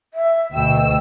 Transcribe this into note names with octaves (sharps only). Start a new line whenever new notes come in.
E5
D2 B2 G5 E6